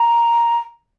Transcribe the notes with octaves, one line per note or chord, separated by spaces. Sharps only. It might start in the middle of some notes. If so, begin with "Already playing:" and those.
Already playing: A#5